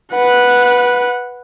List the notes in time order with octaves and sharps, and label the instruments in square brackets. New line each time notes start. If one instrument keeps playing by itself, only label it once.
[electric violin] B4 F#5